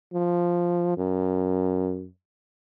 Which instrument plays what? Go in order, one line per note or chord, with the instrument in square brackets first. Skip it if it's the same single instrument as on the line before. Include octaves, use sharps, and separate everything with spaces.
[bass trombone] F3
F#2